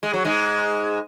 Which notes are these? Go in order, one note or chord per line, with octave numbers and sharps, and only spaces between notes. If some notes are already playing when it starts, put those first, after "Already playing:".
G#3
F#3
G#2 G#3